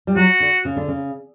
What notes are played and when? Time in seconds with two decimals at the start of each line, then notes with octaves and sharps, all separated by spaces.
0.07 G3
0.16 F#3 F#4
0.40 D3
0.65 C#3
0.76 D3
0.88 C#3